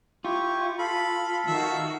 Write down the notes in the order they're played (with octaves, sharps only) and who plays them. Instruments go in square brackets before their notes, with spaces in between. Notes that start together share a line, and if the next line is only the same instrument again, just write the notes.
[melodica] E4 G4 C#6 [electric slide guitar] F4
[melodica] A4 F5 [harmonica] B5
[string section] D#3 D#4 F#4 [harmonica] E5